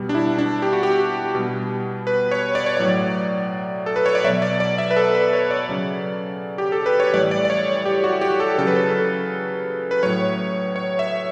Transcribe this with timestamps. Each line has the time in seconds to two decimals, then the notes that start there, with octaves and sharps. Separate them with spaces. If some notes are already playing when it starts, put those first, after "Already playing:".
Already playing: B2 G3
0.09 D4
0.15 E4
0.38 D4
0.62 G4
0.73 F#4
0.83 G4
1.35 B2 G3
2.07 B4
2.31 C#5
2.55 D5
2.66 C#5
2.77 A2 F#3 D5
3.86 A4
3.96 B4
4.06 C#5
4.15 D5
4.24 B2 F#3 E5
4.42 D5
4.60 D5
4.78 E5
4.91 B4
4.96 A4
5.15 B4
5.33 C#5
5.51 D5
5.69 C#3 F#3
6.58 G4
6.72 A4
6.86 B4
7.00 C#5
7.13 A2 E3 G3 D5
7.31 D5
7.45 D5
7.50 C#5
7.85 G4
8.04 F#4
8.21 G4
8.40 A4
8.58 C#3 F#3 A4
8.67 B4
8.76 A4
9.91 B4
10.03 A2 F#3 C#5
10.76 C#5
10.99 E5